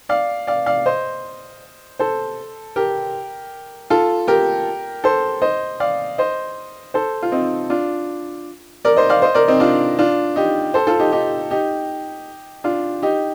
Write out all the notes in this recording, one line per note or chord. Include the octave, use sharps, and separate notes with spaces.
D5 F5
D5 F5
D5 F5
C5 D#5
A4 C5
G4 A#4
F4 A4
G4 A#4
A4 C5
C5 D#5
D5 F5
C5 D#5
A4 C5
F4
C4 D#4
D4 F4
A#4 D5
C5 D#5
D5 F5
C5 D#5
A#4 D5
C4 D#4
D4 F4
D4 F4
D#4 G4
A4 C5
F4 A4
D#4 G4
D#4 G4
D#4 G4
D4 F4
D#4 G4